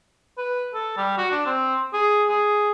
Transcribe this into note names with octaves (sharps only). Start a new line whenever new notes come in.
B4
A4
G3
F#4
D4
C4
G#4
G#4